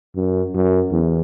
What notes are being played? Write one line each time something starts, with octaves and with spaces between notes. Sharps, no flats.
F#2
F#2
E2